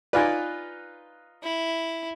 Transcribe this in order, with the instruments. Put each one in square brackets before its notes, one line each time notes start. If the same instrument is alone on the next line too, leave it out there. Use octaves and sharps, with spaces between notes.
[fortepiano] D#4 F4 B4 [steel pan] D5 G#5
[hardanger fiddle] E4